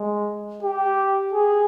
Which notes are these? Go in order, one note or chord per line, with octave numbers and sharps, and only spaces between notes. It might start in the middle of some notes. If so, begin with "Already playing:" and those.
Already playing: G#3
G4
G#4